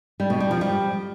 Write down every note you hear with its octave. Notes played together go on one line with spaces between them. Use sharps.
G3
B2
G3
F3
G3